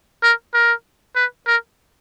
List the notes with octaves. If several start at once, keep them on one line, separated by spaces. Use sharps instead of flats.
A#4
A#4
B4
A#4